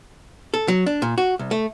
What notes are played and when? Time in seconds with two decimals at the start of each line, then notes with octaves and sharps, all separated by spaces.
0.54 A4
0.68 F#3
0.86 D4
1.02 A#2
1.18 F#4
1.39 C2
1.51 A3